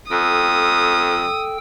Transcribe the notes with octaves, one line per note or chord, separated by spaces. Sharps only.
F2 A4 G5 D#6 E6